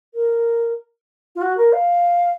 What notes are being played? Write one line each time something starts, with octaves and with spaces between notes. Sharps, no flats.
A#4
F4
F#4
A#4
F5